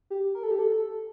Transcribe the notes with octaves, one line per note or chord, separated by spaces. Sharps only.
G4
A#4
A4
G4
A4
A4